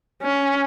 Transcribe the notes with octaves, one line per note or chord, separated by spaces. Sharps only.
C#4